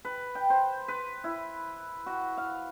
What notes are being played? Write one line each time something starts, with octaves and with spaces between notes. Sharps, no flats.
B4
G5
C5
B4
E4
F#4
F5